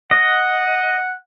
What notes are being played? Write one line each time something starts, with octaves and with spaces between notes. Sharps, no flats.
D#5 F#5